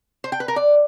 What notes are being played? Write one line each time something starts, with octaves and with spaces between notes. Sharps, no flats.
C5
G5
B4
A#4
D5